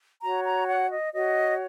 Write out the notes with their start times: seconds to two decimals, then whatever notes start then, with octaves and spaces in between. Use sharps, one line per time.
0.21 F#4 C#5 A#5
0.44 A#5
0.67 F#5
0.90 D#5
1.13 F#4 C#5 D#5